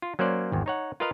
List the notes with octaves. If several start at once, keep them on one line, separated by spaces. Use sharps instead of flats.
F4
F#3 A#3 C#4 C5 D5
G#1 E2
D#4 C#5 F#5
F4 A#4 B4 D#5 F5